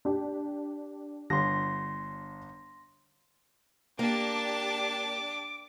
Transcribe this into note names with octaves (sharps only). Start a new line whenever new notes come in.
D4 G4
G1 C6 A#6
A#3 D4 G4 A5 D6